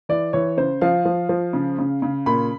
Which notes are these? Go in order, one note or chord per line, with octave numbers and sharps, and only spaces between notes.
E3 D5
E3 C#5
C#3 C5
F3 F5
F3
F3
C#3
C#3
C#3
A#2 B5